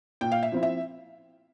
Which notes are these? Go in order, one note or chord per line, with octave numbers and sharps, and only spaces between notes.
A#2 G5
F5
E5
F3 C4 E4
E5